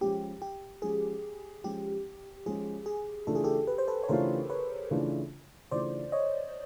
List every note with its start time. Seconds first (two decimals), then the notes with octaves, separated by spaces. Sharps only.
0.01 F3 G#3 C#4 G4
0.42 G4
0.82 F3 G#3 C#4 G#4
1.64 F3 G#3 C#4 G4
2.46 F3 G#3 C#4 G#4
2.86 G#4
3.27 C#3 E3 A3 D4 F4 A4
3.35 G#4
3.44 G4 A4
3.67 B4
3.78 C5
3.88 A4 B4
4.03 C#5
4.09 C#3 E3 A3 D4 F4 A#4 C5
4.50 B4 C#5
4.91 C#3 E3 A3 D4 F4
5.71 C#3 E3 A3 D4 F4 C5 D5
6.12 C#5 D#5